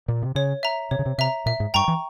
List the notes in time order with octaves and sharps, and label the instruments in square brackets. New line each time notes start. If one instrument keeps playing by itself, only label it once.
[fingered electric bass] A#2
C3
[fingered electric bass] C#3 [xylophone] C#5
[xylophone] E5 A#5
[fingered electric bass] C3 [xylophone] C#5
[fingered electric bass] C#3
C3
[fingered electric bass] C3 [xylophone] E5 A#5
[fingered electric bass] A#2 [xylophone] E5
[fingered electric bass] G#2
[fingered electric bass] G2 [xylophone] G5 A#5 C#6
[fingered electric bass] E3